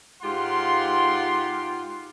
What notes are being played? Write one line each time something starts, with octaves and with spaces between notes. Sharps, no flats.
G#2 F4 G4 F5 F#5 C6